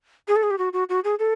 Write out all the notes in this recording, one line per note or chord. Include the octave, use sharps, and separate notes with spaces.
G#4
A4
G#4
G4
F#4
F#4
F#4
G#4
A4